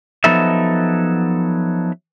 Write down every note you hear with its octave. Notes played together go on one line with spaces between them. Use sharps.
F3 F#3 B3 D#4 A4 E5